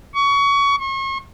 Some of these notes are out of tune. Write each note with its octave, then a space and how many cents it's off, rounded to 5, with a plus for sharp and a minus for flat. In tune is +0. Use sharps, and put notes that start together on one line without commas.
C#6 +25
C#6 -40